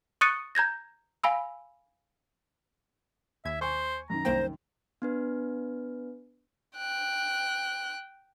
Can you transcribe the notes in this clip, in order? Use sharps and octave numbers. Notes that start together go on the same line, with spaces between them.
C#6 D#6 F#6 A6 C#7 D#7
A#5 G6 G#6 A#6
F5 G#5 B5 E6
D#2 E5 G#6
C5 G#5 C#6
F#2 D#3 A#5
C2 A#3 C5 G5
B3 D4 B4
G5 F#6